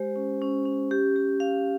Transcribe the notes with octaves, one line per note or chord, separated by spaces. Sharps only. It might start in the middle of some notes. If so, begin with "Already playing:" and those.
Already playing: G#3 G4 C5
C#4
C#4
C#4
G4
G4
F5